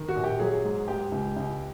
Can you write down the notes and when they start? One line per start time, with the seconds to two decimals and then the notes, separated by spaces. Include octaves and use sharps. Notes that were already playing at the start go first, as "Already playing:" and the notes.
Already playing: D#3
0.08 F#4
0.16 A#1
0.24 G4
0.40 F#3 G#4
0.64 G#2
0.88 G#3 G4
1.12 C#2
1.36 C#2